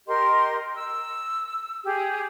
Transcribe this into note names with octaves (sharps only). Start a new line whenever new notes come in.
G4 A#4 D#5 C6
E6
G4 G#4